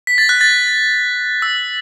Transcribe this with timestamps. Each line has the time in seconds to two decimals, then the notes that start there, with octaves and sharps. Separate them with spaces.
0.07 B6
0.18 A6
0.29 F#6
0.41 A6
1.42 E6